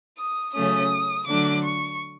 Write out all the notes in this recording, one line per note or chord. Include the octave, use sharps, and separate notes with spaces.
D#6
C#3 F#3 A3 C#4 D#6
D3 F#3 A3 D4 D6
C#6